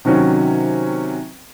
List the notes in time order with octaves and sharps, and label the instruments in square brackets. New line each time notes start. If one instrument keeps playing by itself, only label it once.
[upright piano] C3 D#3 F#3 C#4